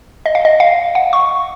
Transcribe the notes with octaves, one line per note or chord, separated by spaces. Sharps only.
D#5
F5
D#5
F5
F#5
C#6